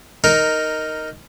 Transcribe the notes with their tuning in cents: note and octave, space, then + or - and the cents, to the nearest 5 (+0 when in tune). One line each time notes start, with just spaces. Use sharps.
D#4 +0 A#4 -5